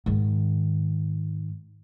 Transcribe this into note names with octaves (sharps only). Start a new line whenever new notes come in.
G#2 D#3